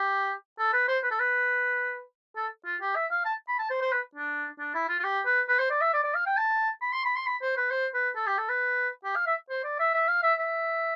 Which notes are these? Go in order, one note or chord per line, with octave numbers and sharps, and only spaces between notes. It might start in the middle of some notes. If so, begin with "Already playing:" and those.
Already playing: G4
A4
B4
C5
B4
A4
B4
A4
F4
G4
E5
F5
A5
B5
A5
C5
C5
B4
D4
D4
E4
F4
F4
G4
B4
B4
C5
D5
E5
D5
D5
F5
G5
A5
B5
C6
B5
C6
B5
C5
B4
C5
B4
A4
G4
A4
B4
G4
F5
E5
C5
D5
E5
E5
F5
E5
E5